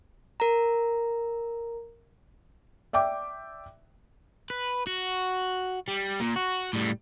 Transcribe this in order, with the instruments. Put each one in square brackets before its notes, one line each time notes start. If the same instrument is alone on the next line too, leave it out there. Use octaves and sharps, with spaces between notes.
[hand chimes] A#4 A#5
[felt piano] D5 E5 G5 D6
[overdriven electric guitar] B4
F#4
G3
A#2
F#4
A2 G3